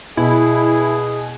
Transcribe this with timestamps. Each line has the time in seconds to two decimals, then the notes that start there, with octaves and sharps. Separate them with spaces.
0.17 B2 E4 G#4